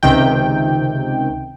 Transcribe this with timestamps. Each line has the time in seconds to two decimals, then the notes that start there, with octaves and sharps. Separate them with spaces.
0.03 C#2 C3 D#3 G5